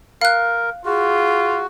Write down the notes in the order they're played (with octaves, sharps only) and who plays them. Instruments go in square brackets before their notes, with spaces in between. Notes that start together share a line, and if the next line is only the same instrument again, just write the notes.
[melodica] A#4 [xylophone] F5 F#6
[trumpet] F4 [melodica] F#4 [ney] G#4